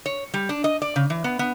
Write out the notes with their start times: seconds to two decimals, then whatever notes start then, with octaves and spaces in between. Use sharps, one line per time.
0.06 C#5
0.34 G3
0.49 D4
0.64 D#5
0.82 D5
0.96 C#3
1.10 E3
1.24 B3
1.39 B3